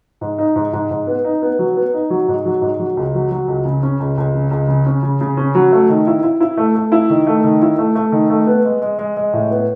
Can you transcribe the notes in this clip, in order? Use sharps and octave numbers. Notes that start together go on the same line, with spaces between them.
G#2
D#4
G#2
G#2
G#2
B3
D#4
B3
F#3
B3
D#4
F#3
G#2
F#3
G#2
F#3
C#2
F#3
F#3
C#2
C#3
C#4
C#2
C#2
C#3
C#2
C#3
C#4
C#3
C#3
C#4
F#3
A3
D#3
E4
E4
E4
A3
A3
E4
D#3
A3
D#3
E4
A3
A3
D#3
A3
B3
G#3
G#3
G#3
G#3
A2
B3